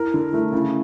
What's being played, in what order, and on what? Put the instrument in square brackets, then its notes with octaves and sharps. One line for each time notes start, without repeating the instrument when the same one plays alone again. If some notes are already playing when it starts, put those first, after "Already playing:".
Already playing: [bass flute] E4 [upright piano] A#4
[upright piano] D3
A3
C#3